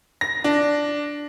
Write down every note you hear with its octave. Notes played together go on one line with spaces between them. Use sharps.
A#6
D4